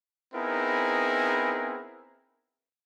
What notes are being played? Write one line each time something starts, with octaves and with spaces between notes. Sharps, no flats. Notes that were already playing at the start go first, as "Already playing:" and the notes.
B3 C4 D#4 E4 G#4 A#4